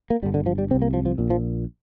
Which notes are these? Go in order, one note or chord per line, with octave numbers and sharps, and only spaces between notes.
A#3
G1 G2 D3 G3
D3
F3
G3
C2 C3 C4
A#3
F3
F3
A#1 A#2
F3